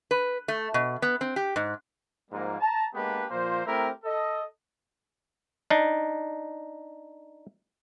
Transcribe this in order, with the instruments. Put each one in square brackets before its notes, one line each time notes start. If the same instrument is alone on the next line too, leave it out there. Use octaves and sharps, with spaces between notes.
[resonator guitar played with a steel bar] B4
A3
B2
B3
C4
G4
G#2
[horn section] G#2 F3 G3 A#3
A5 A#5
G#3 A#3 B3 D4 G4 B4
A#2 F3 A#3 C5
A3 C4 E4 G4 A#4
A4 D#5
[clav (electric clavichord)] D4 D#4